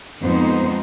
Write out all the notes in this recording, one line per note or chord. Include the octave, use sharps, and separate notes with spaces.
F2 G#3 B3 D#4 C5